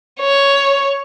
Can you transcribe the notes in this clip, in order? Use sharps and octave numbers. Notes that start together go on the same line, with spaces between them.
C#5